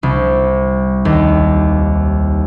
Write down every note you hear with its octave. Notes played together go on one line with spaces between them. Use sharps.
C2
D#2